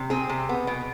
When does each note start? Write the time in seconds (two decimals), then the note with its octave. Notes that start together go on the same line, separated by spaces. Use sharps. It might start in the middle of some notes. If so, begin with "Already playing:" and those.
Already playing: C3
0.10 C4 G#4
0.29 C3
0.49 B3
0.67 B2